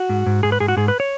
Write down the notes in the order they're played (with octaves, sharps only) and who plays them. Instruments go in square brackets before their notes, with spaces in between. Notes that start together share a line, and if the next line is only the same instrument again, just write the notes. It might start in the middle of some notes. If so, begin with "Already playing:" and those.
Already playing: [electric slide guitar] F#4
G#2
G#2
G#2 G#4
B4
G#2 G#4
F#4
G#2 G#4
B4
C#5